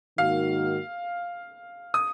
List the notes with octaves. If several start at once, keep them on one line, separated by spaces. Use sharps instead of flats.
G#2 D#3 A#3 D#4 F#4 F5
D#6